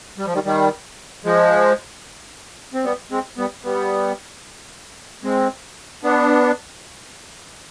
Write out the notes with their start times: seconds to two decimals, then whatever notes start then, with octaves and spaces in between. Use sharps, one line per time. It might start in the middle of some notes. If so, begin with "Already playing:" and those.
0.18 G3
0.26 F3
0.34 D#3 G3
0.45 D#3 G3
1.25 F3 G#3
2.74 C4
2.84 G3 B3
3.11 G#3 C4
3.38 G3 B3
3.64 G3 B3
5.23 G#3 C4
6.03 B3 D4